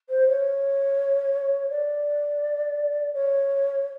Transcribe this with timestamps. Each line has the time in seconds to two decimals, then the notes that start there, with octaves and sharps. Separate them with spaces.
0.09 C5
0.27 C#5
1.70 D5
3.13 C#5